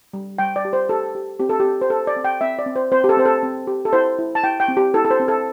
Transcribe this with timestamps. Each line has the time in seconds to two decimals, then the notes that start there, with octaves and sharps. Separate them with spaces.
0.13 G3
0.38 G3 G5
0.56 D5
0.65 G4
0.73 C5
0.89 G4 A4
1.15 G4
1.40 C4 G4
1.49 A4
1.60 G4
1.65 C4
1.81 C5
1.90 G4 A4
2.07 D5
2.16 C4
2.24 G5
2.41 C4 E5
2.59 D5
2.66 C4
2.76 C5
2.92 C4 C5
3.04 G4
3.09 A4
3.17 C4 C5
3.25 A4
3.43 C4
3.67 G4
3.85 A4
3.93 E4 C5
4.19 E4
4.35 A5
4.44 E4 G5
4.60 G5
4.68 C4
4.77 G4
4.94 E4 A4
5.05 A4
5.11 C5
5.20 C4
5.28 A4